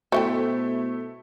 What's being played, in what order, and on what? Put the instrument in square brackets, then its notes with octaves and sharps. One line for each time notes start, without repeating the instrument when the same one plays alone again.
[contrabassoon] B2 [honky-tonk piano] A3 E4 [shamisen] F#4 D#5 G5 [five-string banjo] C5 E5